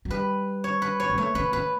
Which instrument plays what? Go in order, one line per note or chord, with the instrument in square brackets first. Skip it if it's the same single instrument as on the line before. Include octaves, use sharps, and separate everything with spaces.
[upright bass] F#3
[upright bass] G3 [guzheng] B4
[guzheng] C#5
B4
C#5
[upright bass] G3
[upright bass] A3 [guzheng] C#5
[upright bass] A3 [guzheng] B4
[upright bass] A3 [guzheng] B4